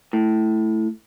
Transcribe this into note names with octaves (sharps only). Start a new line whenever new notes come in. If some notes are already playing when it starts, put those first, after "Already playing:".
A2